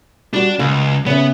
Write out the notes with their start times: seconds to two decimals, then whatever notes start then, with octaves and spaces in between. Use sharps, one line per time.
0.33 G3 D4 F#4
0.59 C#2 F5
1.06 C#3 B3 E5